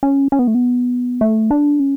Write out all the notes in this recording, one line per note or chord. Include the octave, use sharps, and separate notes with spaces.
C#4
C#4
B3
A3
B3
A3
D4
C#4